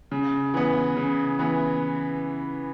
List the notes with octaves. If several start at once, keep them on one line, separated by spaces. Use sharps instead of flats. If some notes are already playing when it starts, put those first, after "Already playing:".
C#3
E3 B3
C#3
E3 B3